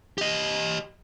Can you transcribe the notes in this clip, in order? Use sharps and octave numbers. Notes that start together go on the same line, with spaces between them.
G4 D#5